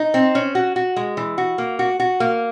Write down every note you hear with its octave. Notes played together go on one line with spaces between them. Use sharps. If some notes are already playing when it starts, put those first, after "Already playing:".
Already playing: D#4
C4
C#4
F#4
F#4
G#3
E3
F#4
A#3
F#4
F#4
A#3